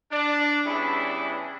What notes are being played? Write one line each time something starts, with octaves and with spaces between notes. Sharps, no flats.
D4
C#3 E3 G3 B3 D4 E4